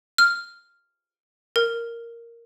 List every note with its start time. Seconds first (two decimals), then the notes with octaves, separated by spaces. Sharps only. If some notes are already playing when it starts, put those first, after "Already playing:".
0.18 F6
1.56 A#4